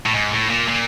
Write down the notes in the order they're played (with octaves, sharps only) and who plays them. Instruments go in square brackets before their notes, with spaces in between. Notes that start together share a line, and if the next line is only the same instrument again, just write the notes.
[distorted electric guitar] A2
G#2
A2
A#2
A#2